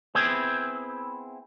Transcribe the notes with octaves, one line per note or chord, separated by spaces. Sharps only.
B3 C4 E4 G#4